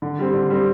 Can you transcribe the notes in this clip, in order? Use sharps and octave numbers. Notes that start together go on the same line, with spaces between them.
D3
G3 C4
D3
G3 C4